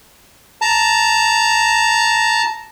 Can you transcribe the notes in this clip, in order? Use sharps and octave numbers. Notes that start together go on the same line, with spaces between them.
A5 A#5